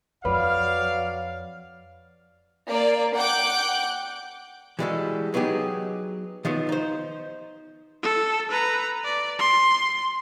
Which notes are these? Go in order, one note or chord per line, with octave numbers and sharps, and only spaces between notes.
F2 F#3 B4 D5 F5 F6
A#3 D5
F#5 G5 D6 F#6 G6
E3 G3 G#3 F4 F#4 A4
F#3 B3 D#4 G4 G#4
D#3 F3 F#3 B3
D#4 C5
A4
B4 A#5
D5
C6